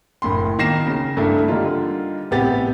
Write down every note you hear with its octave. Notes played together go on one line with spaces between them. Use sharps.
F#1 A2 B5 C6
B2 D#3 A#3 A#6 C7 E7
C#3
G2 A3 A#3 E4 A4
D3 G3 A#3 D#4 F4
A1 C3 B3 G4 A6